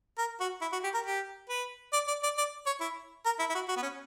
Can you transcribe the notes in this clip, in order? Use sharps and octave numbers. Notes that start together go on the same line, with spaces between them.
A#4
F#4
E4
F#4
G4
A#4
G4
B4
D5
D5
D5
D5
C#5
E4
A#4
E4
E4
F#4
F#4
B3
C#4